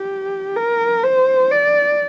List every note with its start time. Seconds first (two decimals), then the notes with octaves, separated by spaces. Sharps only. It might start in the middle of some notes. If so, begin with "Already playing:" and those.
Already playing: G4
0.56 A#4
1.04 C5
1.51 D5